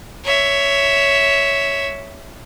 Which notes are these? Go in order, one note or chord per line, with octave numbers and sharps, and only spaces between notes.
C#5 E5